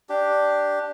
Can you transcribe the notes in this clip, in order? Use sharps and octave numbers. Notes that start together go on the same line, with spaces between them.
D4 G4